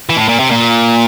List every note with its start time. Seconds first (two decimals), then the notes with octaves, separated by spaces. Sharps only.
0.09 E3
0.17 A2
0.28 A#2
0.40 C3
0.51 A#2